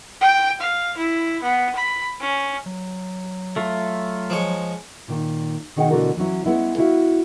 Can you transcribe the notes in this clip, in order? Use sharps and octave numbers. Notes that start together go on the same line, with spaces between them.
G5
F5
E4
B3
B5
C#4
F#3
A3 F4
F3 G#3 C#5
A#2 D#3
B2 D#3 D#4 G#4 F#5 G5
B2 D3 E3 A3 F#4 A#4
E3 F#3 C#4 E4
G#3 B3 C#4 E4
E4 F#4 E5 F5